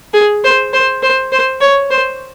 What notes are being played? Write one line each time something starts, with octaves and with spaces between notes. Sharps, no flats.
G#4
C5
C5
C5
C5
C#5
C5